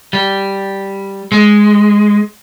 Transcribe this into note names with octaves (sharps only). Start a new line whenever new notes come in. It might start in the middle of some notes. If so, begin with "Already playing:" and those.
G3
G#3